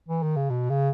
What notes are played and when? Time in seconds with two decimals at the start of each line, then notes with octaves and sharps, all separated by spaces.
0.08 E3
0.23 D#3
0.36 C#3
0.50 B2
0.70 C#3